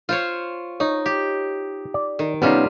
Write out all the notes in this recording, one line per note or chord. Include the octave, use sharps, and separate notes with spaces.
F4 C5 C#5
D#4 C#5
G4
D5
D#3
C3 G3 B3 C#4 D#4 F4